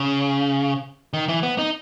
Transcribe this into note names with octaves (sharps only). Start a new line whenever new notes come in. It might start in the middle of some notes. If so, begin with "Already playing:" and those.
Already playing: C#3
D#3
E3
B3
D#4